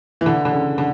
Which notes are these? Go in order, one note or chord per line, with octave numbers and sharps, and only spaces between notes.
E3
D3
D3
C#3
D3